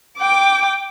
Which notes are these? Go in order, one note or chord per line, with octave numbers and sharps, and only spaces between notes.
G5 D6